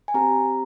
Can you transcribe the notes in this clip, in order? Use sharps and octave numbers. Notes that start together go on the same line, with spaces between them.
G#5
C4 G4 A#5